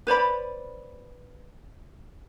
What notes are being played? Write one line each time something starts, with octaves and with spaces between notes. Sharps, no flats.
B4 C5 D5 B5